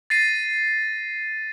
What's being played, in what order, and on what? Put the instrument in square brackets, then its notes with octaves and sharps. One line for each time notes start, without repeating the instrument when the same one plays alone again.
[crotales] A6 A#6 C7 D#7